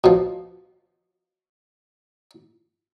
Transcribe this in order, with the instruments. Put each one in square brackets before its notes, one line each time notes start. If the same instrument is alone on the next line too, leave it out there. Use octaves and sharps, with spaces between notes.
[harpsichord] B2 F3